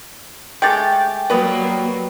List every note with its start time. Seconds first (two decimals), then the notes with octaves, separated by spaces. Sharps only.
0.62 G#3 A3 G4 G5 A6
1.30 F#3 G3 A#3 B3 B4